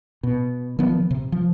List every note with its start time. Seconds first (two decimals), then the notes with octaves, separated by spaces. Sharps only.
0.23 B2
0.79 D#3 F3 B3
1.11 C3
1.32 F3